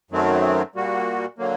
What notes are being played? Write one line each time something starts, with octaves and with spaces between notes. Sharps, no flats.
F#2 D#3 F#3 A3 C4
A#2 G3 A#3 F#4
D3 F#3 A#3